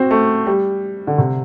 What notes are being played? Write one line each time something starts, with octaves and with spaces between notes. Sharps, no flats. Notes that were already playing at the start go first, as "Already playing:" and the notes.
Already playing: C4 F#4
A3
G3
D3
C3